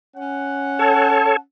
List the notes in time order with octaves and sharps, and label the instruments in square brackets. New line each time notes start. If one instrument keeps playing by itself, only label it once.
[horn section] C#4 F#5
[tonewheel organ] A4 C#5 [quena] A5